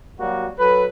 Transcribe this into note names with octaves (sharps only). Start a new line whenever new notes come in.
F#3 G3 A#3 F#4
F#3 A4 B4